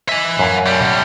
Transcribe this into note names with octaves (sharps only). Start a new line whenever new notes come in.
D#5 E5 G#5
F#2 F5
A2 G3